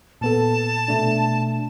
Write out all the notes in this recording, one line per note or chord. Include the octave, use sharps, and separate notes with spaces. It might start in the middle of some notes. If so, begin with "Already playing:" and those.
A#2 B3 A4 A5
B2 A3 D4